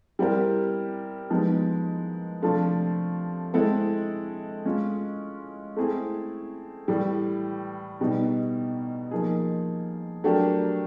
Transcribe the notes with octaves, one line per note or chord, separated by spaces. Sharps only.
G3 C4 E4 G4 A#4
F3 G#3 B3 D#4
C3 F3 A3 D4 F4
G#3 C4 E4 A4
G#3 C#4 F4
A3 C4 E4 G#4
A2 E3 G3
B2 G3 B3 D#4
F3 A#3 D#4 G#4
F#3 A3 D4 G4 A#4